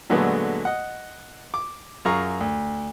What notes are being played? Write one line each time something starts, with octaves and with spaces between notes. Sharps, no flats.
A#2 D3 F#3 G#3 A3 B3
D#5 F#5
D6
F#2 F4 G#4 F5 A#5 C#6
D2